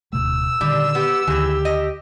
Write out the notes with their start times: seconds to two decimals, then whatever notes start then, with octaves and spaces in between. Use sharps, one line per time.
0.13 D1 B2 A3 E6
0.61 A#2 D3 D#3 G3
0.95 B3 G4
1.27 D2 D#3 E3 G4 G#4
1.65 D#5